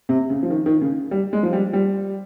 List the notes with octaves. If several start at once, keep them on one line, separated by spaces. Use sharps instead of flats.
C3
C#3
F3
D#3
D#3
C#3
G3
G#3
F3
G3
G3